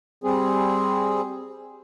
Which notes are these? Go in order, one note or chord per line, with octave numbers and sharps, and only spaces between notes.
G3 C4 G#4